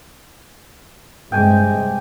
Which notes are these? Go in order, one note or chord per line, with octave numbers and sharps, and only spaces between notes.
G2 C3 G#3 G5 G#5 D6